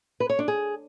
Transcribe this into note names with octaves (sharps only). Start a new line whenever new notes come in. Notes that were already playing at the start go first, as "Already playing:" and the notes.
B4
C#5
D4
G#4